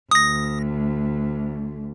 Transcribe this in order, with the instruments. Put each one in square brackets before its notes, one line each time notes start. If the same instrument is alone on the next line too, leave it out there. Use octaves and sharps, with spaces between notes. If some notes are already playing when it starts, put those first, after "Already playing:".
[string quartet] D2 [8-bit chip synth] D#6 A#6